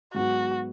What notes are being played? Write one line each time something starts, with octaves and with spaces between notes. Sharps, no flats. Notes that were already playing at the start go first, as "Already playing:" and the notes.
G#2 F#3 B3 F#4